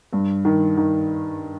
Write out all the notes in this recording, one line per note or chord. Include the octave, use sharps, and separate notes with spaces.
G2
D#3
D#3